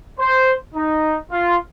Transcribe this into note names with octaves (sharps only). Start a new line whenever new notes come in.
C5
D#4
F4